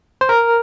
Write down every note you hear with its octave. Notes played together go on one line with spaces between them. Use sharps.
C5
A#4